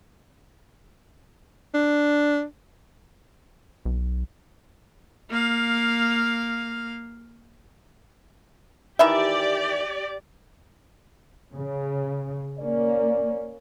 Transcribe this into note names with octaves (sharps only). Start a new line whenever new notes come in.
D4
B1
A#3 F5
D#3 E3 G4 D5 E5
C#3
A#3 C#4 D5